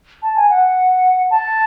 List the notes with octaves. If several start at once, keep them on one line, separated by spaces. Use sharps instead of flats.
A5
G#5
F#5
A5